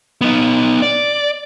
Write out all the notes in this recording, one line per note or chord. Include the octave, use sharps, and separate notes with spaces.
B3 D#4
D5